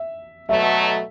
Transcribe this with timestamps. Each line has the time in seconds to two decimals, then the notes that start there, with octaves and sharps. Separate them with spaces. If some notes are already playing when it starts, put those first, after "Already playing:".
Already playing: E5
0.49 B2 F#3 A3 E5